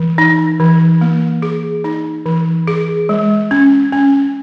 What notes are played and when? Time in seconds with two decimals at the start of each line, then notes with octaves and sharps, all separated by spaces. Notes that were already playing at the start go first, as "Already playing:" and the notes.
Already playing: E3
0.18 D#4
0.60 E3
1.01 A#3
1.42 G#4
1.84 D#4
2.26 E3
2.68 G#4
3.09 G#3
3.51 C#4
3.93 C#4